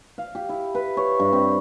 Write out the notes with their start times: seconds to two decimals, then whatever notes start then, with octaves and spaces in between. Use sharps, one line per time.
0.18 F5
0.35 G4
0.49 E4
0.75 B4
0.97 C#5
1.20 G2
1.33 C4